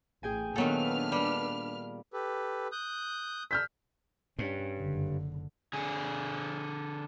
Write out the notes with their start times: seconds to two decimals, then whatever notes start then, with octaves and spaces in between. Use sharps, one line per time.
0.23 A1 G#4 G5 G#5
0.56 A#2 D#3 F#3 B3 D4 A4 B4 F6
1.12 G3
2.13 G4 A4 B4
2.72 D#6 F#6 G6
3.51 E6 F6 G6 B6
4.39 G2 C#4
4.79 F#1 D3
5.73 D3 G#4